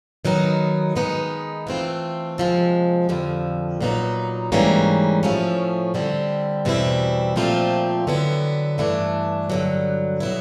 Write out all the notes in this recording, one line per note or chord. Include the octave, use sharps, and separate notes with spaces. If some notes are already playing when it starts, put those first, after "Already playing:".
D#3 F#3 B3 D#4
D#3 G#3 B3 D#4
E3 A3 C4 F4
C3 F3 G#3
F2 D3 F3
A#2 F#3 B3 D#4
G#2 E3 G3 A#3 C#4
A2 F3 A3 C#4
D3 G3 C4 E4
E2 B2 G3 C4 E4
A#2 F3 A3 C4 F4
D3 F#3 B3 E4
G2 E3 A3 D4
G2 D3 F#3
B2 F#3 B3 E4